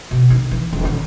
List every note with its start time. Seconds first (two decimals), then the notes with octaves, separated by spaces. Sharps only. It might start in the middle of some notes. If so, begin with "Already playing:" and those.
0.11 B2
0.30 D#3
0.51 E3
0.73 D#1
0.85 D#3